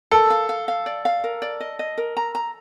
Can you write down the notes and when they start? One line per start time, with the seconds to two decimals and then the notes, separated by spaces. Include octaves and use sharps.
0.11 A4 A#4
0.30 F5
0.49 F5
0.68 F5
0.86 D5
1.05 F5
1.24 A#4
1.42 D5
1.60 D#5
1.79 D#5
1.98 A#4
2.17 A#5
2.35 A#5